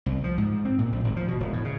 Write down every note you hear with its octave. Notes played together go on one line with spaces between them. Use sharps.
C2
F3
G#2
C4
A#2
A#1
G#1
F3
B2
E1
A2
C#3